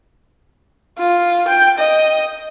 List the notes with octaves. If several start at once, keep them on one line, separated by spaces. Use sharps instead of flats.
F4
G5
D#5